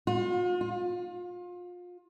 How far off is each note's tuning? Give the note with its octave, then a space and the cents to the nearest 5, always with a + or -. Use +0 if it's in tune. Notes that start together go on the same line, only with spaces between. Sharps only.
F4 +45
F4 +30